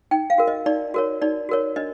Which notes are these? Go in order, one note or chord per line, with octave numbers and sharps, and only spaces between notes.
D#4 G5
F5
F#4 A#4
D#5
D#4 D5
F#4 A#4 C#5
D#4 D5
F#4 A#4 C#5
D4 D#5